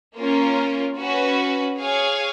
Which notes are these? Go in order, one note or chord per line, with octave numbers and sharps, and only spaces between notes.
A#3 C#4 F4 A#4
C#4 F#4 B4
G#4 C#5 F5 G#5